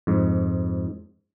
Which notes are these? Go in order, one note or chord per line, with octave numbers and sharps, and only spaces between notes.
F2 G#2